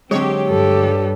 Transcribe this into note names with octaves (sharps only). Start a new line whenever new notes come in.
D3 F#3 G#3 C4 G4 C#5
G2 G4 A4